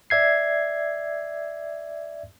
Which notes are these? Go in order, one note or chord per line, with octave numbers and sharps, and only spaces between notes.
D5 E5 G#6 C7